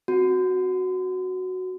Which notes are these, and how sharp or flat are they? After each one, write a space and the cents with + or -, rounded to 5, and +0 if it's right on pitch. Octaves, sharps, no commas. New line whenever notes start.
C4 +0 F#4 +0